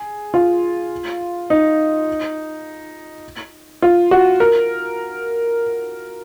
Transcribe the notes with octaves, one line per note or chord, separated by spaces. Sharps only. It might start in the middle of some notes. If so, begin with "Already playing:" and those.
Already playing: G#4
F4
D#4
F4
F#4
A#4